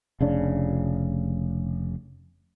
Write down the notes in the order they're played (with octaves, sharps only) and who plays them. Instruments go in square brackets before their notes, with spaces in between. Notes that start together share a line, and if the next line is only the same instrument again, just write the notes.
[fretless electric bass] F1 C#3 D4